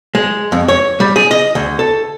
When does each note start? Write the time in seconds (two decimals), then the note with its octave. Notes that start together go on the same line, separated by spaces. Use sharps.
0.15 G#3
0.52 F2
0.68 C#5
1.00 G3
1.16 G#4
1.31 D#5
1.55 D2
1.79 A4